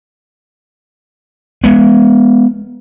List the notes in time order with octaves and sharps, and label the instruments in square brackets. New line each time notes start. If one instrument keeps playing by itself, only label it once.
[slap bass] G#3 B3